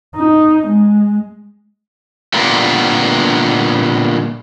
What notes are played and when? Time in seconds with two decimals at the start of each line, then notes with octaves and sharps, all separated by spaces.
0.16 D#4
0.67 G#3
2.33 A#2 D3 G3 A#3 B3